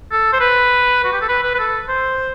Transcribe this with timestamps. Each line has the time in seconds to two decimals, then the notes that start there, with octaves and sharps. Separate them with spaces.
0.12 A4
0.33 C5
0.40 B4
1.04 F#4
1.13 G4
1.21 A4
1.29 B4
1.43 B4
1.54 B4
1.59 A4
1.89 C5